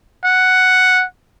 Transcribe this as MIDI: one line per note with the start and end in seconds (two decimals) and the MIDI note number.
0.24 1.04 78